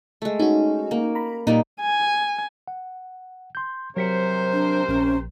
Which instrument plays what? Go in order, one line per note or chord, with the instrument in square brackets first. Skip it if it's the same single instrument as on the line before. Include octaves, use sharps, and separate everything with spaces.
[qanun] G#3 A3
[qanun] C#4 [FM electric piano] D#4 F#4
[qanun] A#3
[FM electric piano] A#5 B5
[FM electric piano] A#2 [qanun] G3 A#3 D#4
[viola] G#5
[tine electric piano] F#5
C6 G6
[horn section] C3 A#4 C5 [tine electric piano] F#3 B6 C#7
[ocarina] D4
[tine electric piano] A#1 [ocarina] C#4